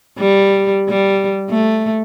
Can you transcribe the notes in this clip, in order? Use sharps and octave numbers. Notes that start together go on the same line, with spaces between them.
G3
G3
A3